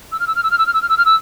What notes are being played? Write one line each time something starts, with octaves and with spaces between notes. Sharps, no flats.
E6
F6
E6
F6
E6
F6
E6
F6
E6
F6
E6
F6
E6